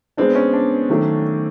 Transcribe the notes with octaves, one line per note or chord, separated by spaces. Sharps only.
G#3 B3 C4 D4
C#4
D4
D#3 F#3 A3